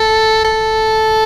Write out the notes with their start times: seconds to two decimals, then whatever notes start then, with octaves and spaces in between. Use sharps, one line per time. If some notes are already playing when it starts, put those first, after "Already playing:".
Already playing: A4
0.44 A4